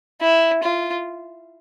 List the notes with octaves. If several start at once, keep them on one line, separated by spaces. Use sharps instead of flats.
E4
F4